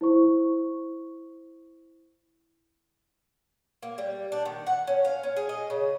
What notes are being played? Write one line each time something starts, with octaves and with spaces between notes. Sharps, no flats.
E4 C5 C#6
A#3
G3
D4
D#3
F#5
C#4
F5
C#4
G#4
D#5
C#3